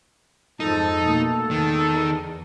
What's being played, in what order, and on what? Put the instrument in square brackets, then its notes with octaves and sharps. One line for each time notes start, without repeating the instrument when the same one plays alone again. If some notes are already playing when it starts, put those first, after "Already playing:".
[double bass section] F2 G#2 F3 [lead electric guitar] D#4 [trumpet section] A4 A5
[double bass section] B2 A3 A#3
[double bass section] E2 [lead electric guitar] D#3